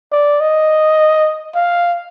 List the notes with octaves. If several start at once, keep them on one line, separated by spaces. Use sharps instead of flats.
D5
D#5
F5